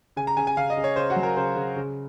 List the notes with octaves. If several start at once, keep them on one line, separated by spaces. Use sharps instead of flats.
C#3 G#5
A#5
C#3 G#5
G#5
C#3 F5
D#5
C#3
C#5
C#3 C5
F#4
F#3
A#4
C#3 C5
C#3
C#3